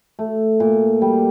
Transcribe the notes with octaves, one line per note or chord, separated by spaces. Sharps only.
A3
A#2
G3